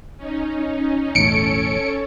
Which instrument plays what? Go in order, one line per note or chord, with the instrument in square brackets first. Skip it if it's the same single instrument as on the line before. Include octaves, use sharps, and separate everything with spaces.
[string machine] C#4 D#4
[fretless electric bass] B1 E2 A2 [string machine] C#4 A4 C#5 [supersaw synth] C#7 D7